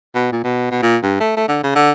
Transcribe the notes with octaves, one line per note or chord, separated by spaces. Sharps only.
B2
A#2
B2
B2
A#2
G2
A3
A3
D3
C#3
D3